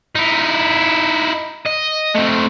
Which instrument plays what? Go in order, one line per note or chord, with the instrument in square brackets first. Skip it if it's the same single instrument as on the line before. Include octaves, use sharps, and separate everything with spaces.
[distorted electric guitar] D#4 E4
D#5
A3 C4